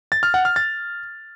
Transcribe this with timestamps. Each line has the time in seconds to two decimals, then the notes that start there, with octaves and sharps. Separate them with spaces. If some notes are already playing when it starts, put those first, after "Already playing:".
0.12 A6
0.23 F6
0.34 F#5
0.45 F6
0.56 A6